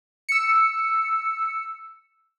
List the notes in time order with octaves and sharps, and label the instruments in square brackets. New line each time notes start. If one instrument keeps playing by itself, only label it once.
[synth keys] E6 C#7